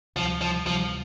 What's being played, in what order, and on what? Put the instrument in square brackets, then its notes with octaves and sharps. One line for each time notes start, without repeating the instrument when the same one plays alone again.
[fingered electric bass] D2 C3 E3 G3 [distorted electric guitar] F3
[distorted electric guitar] F3
[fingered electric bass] D2 C3 E3 G3 [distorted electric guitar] F3